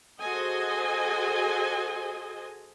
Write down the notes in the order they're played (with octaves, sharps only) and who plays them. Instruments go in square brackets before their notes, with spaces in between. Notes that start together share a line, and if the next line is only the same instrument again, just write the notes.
[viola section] F#4 G#4 A4 C5 D#5 G#5